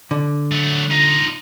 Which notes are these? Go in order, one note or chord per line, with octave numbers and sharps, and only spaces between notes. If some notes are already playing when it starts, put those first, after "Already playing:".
D3
F#3 A3
D#4 F4 A#5